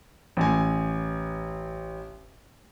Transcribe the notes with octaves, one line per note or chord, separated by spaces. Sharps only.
A1 G#5